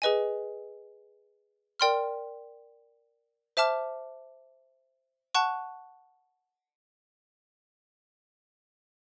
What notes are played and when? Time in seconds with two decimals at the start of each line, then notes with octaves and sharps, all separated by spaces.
0.02 G#4 B4 D#5 G#5
1.80 A#4 D5 G5 C6 F6
3.57 C5 E5 A5 D6 F6
5.35 F#5 A5 C#6 F#6